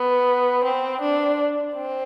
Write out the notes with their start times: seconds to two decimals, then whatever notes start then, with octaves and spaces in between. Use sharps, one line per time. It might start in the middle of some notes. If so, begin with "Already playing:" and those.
Already playing: B3
0.64 C4
1.01 D4
1.75 C4